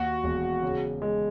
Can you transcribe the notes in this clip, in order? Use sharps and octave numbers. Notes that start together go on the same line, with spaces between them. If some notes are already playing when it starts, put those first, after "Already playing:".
Already playing: D#2 F#4
E1
C#3
G#3